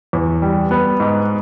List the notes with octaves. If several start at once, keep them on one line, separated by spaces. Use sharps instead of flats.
E2
G3
B3
G#2